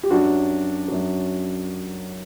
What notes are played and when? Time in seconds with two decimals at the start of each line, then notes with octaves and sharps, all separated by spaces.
0.03 G4
0.10 F#2 F#3 D4 F#4
0.88 F#2 F#3